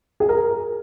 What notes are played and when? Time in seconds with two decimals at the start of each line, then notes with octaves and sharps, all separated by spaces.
0.20 G#4
0.29 A#4